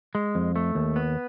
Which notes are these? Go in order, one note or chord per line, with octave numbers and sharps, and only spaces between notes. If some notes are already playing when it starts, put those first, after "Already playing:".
G#3
F2
A3
D#2
B3